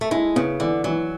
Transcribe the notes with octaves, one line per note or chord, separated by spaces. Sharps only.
A3
G#3 E4
C#3 B3
D3 E3
E3 F#3